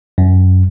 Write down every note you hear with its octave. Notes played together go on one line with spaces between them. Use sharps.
F#2